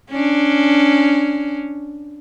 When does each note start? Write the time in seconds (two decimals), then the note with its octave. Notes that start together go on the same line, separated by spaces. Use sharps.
0.10 C#4 D4